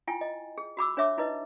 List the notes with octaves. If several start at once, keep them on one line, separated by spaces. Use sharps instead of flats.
E4 F4 G5 G#5
D#5
G#4
F#4 B5 D6 E6
D4 C#5 E5 D6
D#4 E4 B4 D#5